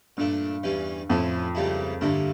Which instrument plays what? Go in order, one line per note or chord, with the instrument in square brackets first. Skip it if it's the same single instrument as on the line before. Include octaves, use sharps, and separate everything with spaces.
[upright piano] G2 [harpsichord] A#2 A3 D4
[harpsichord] E2 E3 G3 C#4
[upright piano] F2 [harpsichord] A2 F3 C#4 E4
[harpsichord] C#2 C#3 G3 A#3 E4
[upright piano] G2 [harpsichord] D3 G3 A#3 E4